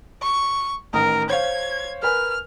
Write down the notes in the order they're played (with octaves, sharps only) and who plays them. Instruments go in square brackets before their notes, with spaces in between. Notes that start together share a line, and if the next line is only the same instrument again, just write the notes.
[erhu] C#6
[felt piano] A1 D#3 D#6 [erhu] A#4
[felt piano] C5 C#5 F5 [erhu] G#6
[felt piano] A#4 B4 G#5 [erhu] F6